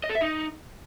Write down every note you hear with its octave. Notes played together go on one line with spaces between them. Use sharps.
D#5
A4
E5
D#4